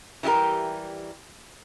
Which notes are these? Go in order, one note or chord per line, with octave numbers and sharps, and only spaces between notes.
E3 G3 E4 G4 A#4